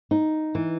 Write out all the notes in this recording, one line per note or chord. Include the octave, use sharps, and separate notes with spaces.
D#4
E3